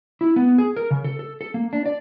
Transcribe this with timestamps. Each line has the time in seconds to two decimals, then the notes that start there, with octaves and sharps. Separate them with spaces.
0.21 E4
0.36 B3
0.58 G#4
0.76 A#4
0.91 C#3
1.04 A4
1.19 A4
1.41 A4
1.54 A#3
1.73 D4
1.86 D5